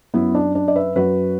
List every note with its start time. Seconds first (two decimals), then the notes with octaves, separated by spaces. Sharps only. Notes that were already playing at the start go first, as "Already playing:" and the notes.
0.14 F#2 F#3 B3 E4
0.35 D4
0.55 D4
0.68 D5
0.76 B4 E5
0.95 F#2 F#3 F#4 B4